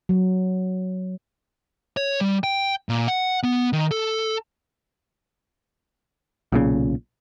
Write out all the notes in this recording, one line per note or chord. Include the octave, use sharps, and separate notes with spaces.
F#3
C#5
G3
G5
A#2
F#5
B3
D#3
A4
B1 A#2 C#3